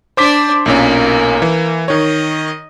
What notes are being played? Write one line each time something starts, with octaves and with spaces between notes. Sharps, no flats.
D4 C5 D5 D6 B6
B1 A#2 A#3 C#4
E3
D#3 C#5 D#5